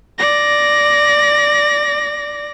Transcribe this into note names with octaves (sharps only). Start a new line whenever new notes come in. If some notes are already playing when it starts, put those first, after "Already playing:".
D5 A#6